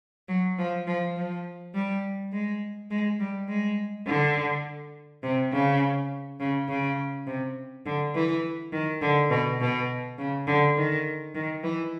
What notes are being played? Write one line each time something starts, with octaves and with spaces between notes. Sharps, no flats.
F#3
F3
F3
F3
G3
G#3
G#3
G3
G#3
D3
C3
C#3
C#3
C#3
C3
D3
E3
D#3
D3
B2
B2
C#3
D3
D#3
D#3
E3